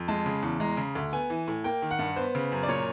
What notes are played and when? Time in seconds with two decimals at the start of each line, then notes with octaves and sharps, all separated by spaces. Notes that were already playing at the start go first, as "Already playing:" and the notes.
Already playing: F2
0.08 G#3 A5
0.26 C#3
0.42 E2
0.60 G#3 A#5
0.77 C#3
0.95 D2
1.12 B3 G#5
1.30 E3
1.48 A2
1.64 A#3 G5
1.82 D#3
1.91 F#5
1.99 G2
2.16 B3 C5
2.35 C#3
2.52 F#2
2.63 D5
2.68 A#2 C#5